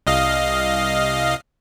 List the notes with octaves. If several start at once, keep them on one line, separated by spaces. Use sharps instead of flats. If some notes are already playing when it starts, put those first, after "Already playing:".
C2 D#5 F5